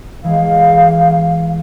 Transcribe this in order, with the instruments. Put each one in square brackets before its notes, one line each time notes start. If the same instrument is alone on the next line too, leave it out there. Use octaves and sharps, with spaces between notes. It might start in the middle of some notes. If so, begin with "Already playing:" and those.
[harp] E3 G#3 [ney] F5